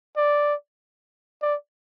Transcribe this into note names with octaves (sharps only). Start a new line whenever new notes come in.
D5
D5